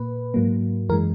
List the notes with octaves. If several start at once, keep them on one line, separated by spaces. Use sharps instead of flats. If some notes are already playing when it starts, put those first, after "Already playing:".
Already playing: A#2 A#3 B4
G#2 F#3 A#3
F#2 E3 G#3 A#4